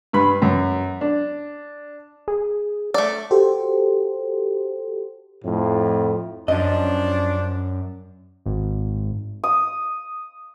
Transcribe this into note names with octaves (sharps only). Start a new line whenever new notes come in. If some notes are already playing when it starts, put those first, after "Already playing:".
G2 B4 B5
F#2
D4
G#4
A3 D5
F#4 G4 A4 C5
F2 A2
F#2 F3 C#4 D4 D#5
G#1
D#6